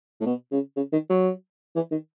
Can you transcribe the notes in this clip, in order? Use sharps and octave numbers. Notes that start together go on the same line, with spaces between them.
A2
B2
C#3
C#3
D#3
F#3
E3
D#3